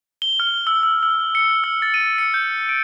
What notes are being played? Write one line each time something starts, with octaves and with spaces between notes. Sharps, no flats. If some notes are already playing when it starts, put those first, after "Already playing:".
G7
F6
E6
E6
E6
C#7
E6
A6
D#7
C#7
G6
D7